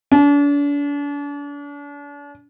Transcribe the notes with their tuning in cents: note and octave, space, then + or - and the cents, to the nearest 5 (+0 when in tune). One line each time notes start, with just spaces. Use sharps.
D4 -40